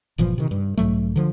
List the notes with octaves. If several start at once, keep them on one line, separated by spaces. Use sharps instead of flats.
G1 A#2 E3 F3
C3 D#3
G2
B1 G#2 F#3 A3
D3 F3